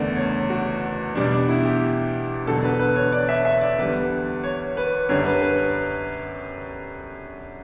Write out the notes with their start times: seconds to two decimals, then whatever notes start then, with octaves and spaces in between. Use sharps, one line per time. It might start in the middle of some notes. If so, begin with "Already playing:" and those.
Already playing: F#1 E2 D3 A3 D5
0.16 C#5
0.50 F#4
1.15 E2 B2 G3 D4
1.32 D4
1.49 E4
1.65 G4
2.47 E1 E2 D3 F#3 A4
2.63 B4
2.79 B4
2.96 C#5
3.12 D5
3.29 E5
3.45 E5
3.61 D5
3.78 E2 D3 G3 B4
4.44 C#5
4.77 B4
5.09 F#2 D3 G3 C#5
5.26 B4
5.42 B4